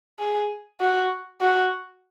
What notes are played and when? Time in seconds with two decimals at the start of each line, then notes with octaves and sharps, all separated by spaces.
0.19 G#4
0.80 F#4
1.41 F#4